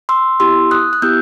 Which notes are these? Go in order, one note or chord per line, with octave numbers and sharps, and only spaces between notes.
C6 E6
B3 E4 G4 C6 E6
D#6 F#6
F#6
B3 E4 G4 E6 G6